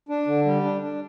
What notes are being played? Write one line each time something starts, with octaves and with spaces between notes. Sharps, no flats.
D4
D3
G3
D4
D4